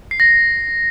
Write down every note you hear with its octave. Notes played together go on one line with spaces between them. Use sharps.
C7
A#6